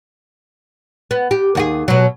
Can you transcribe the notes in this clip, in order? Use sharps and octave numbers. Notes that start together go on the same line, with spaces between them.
B3
G4
D#2 F#4 G#4
B2 F#3